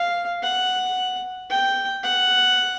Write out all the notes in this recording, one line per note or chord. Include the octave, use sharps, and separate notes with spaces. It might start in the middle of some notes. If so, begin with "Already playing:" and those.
Already playing: F5
F#5
G5
F#5